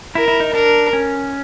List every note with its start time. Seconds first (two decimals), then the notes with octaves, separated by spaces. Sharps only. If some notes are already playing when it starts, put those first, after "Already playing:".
0.15 E4 A#4
0.28 E4
0.40 D#4
0.53 D4 A#4
0.93 C#4